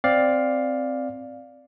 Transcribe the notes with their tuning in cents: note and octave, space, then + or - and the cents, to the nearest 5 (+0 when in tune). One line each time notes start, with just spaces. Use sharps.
C4 +0 D5 +0 F5 +10